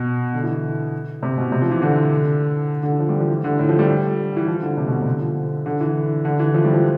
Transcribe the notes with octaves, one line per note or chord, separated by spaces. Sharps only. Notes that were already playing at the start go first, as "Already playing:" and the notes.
Already playing: B2
D3
E3
C3
B2
C3
F3
E3
D3
D3
E3
F3
G3
F3
E3
D3
A2
F3
G3
E3
F3
D3
C3
B2
C3
D3
F3
D3
E3
D3
E3
F3
G3
F3